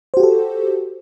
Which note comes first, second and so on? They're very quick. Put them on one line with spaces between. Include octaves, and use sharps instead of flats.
C5 F#4 G4 A4